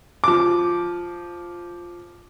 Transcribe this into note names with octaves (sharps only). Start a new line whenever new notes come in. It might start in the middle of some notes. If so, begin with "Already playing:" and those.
F3 D6